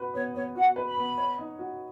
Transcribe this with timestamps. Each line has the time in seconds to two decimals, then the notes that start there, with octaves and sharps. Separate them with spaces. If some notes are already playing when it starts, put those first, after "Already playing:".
Already playing: F#4 B4
0.14 B3 C#5
0.34 B3 C#5
0.55 F#4 F#5
0.76 B4
0.86 B5
0.97 B3
1.18 C#5
1.38 D#4
1.59 F#4